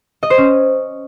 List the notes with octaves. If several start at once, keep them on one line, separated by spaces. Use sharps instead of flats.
D#5
C5
C#4